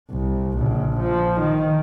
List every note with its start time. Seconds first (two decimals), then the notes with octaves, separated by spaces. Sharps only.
0.11 C2
0.58 A#1 C#3
0.99 F3
1.40 D#3